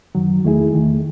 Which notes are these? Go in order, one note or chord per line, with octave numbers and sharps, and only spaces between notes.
F#2 D#3 F#3
E2 D#3 A3 E4 G#4
E2 D#3 A3